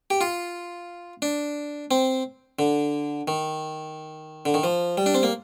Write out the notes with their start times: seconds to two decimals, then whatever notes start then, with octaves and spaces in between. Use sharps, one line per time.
0.10 G4
0.21 F4
1.22 D4
1.91 C4
2.59 D3
3.28 D#3
4.45 D3
4.54 D#3
4.63 F3
4.98 G3
5.06 D4
5.14 C4
5.23 A#3